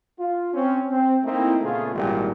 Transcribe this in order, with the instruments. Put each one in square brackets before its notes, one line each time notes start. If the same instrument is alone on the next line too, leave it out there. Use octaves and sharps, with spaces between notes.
[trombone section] F4
C4 C#4
C4
A3 A#3 C4 D#4 E4
A#2 C#3 A3 B3 F4 G#4
G#1 A#2 D#3 E3 G3